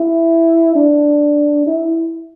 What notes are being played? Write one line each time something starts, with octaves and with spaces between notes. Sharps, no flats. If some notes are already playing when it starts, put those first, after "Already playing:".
Already playing: E4
D4
E4